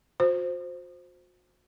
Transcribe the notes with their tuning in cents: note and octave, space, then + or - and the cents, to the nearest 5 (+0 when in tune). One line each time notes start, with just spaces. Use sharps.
F#4 -40 C5 +0